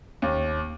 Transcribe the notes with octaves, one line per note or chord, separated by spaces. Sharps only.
D#2